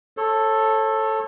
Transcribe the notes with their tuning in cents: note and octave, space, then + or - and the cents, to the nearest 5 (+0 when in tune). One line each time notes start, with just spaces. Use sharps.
A4 +0 C#5 -35